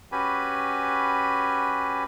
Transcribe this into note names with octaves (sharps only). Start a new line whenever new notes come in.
C#4 F#4 G4 B4 G#5 B5